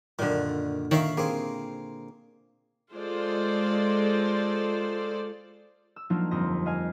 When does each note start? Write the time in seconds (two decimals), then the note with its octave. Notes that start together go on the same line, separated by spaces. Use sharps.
0.19 F#2 A#2 D3 D#3
0.91 D#3 C#5 E5 F5
1.17 A#3 C4 G#4
2.93 G#3 F4 A4 C5 D5
5.96 E6
6.10 F3 F#3 A#3 D4 D#4 F4
6.31 G1 F2 C6 D#6 A#6
6.66 D#5 F5 G#5